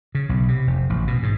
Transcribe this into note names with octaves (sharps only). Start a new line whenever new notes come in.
C#3
B1
C3
F1
A1
B2
G#2